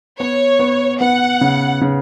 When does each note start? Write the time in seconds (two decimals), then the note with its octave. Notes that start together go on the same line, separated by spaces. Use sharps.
0.19 B3 C#5
0.59 B3
1.00 B3 F#5
1.41 C#3
1.81 C#3